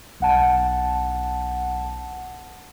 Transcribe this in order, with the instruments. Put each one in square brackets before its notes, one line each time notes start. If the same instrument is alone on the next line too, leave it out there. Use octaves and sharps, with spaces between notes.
[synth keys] B1 F#5 A5